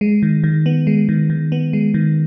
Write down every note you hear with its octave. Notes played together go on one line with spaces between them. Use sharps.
G#3
D#3
D#3
B3
G#3
D#3
D#3
B3
G#3
D#3